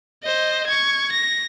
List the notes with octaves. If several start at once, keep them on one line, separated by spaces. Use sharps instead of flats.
C5 D#5
C#6 G#6
A#6